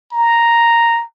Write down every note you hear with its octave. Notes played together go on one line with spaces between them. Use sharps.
A#5